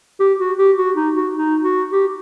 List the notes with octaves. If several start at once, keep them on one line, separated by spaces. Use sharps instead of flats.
G4
F#4
G4
F#4
D#4
F#4
D#4
F#4
G4